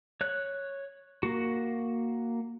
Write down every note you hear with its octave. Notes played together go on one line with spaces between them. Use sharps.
C#5 F#6
A#3 F#4